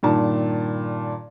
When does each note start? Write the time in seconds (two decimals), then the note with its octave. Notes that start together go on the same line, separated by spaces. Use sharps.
0.03 G2 A#2 D#3 A5